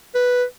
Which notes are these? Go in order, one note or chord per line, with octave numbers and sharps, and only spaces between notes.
B4